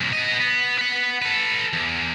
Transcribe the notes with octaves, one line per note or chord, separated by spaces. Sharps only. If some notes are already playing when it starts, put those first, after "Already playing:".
C2 A#2
B3 D#5
B3
B4 F#5
A4 B4
E2